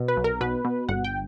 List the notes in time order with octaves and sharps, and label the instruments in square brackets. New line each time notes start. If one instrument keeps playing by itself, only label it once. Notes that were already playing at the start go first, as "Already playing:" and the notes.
Already playing: [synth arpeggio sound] B2
B4
B1
A#4
B2 B4
B2
G1 F#5
G5